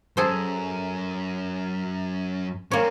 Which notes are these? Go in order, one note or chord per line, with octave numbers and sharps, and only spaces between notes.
F#2 G#4 A4 C5
A#3 C4 C#4 C#5